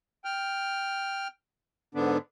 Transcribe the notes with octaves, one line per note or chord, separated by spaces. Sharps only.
G5 F6
G#2 D3 B3 D4